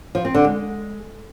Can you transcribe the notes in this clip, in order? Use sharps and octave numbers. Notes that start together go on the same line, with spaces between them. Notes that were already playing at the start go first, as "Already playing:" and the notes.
F3
C4
D3
G#3